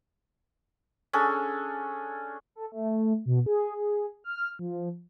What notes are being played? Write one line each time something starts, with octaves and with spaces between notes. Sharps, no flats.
C#4 D4 G#4 A4
A4
A3
B2
G#4
G#4
F6
F3